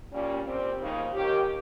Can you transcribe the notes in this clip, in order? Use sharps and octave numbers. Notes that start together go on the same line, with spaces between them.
A#2 G3 C#4
A#2 G3 C4
D#2 C#3 F3 A#3 D#4
D#2 D#3 A#3 C#4 G4